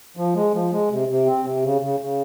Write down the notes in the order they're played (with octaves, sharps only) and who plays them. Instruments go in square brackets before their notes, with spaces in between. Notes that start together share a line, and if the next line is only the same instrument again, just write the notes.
[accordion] F3
G#3
F3
G#3
C3
C3
C4
C3
C#3
C#3
C#3